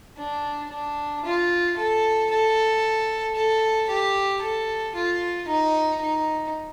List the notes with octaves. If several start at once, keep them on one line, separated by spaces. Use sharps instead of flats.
D4
D4
F4
A4
A4
A4
G4
A4
F4
D#4
D#4